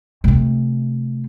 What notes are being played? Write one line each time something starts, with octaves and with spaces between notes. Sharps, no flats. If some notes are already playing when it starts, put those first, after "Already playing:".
C3 A3